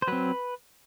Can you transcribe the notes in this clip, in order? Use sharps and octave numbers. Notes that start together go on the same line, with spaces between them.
C5
F#3 C4 B4